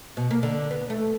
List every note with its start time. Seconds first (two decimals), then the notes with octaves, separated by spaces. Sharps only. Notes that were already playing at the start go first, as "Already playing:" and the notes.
0.17 B2
0.31 A#3
0.43 D3
0.71 B3
0.90 A3